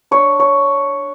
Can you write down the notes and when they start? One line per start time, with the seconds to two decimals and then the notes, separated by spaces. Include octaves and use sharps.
0.11 D4 C#5
0.40 C#5